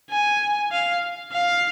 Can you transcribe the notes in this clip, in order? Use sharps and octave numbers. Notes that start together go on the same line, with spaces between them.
G#5
F5
F5